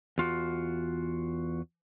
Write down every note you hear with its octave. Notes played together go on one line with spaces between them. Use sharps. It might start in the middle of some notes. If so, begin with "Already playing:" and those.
E2 F4 F#4